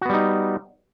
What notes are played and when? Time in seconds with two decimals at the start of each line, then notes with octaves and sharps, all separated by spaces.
0.01 F#4
0.05 B3
0.09 G3
0.13 D#4